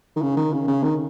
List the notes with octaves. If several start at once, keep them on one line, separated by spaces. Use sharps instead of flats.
D#3
C#3
D#3
C#3
C#3
D#3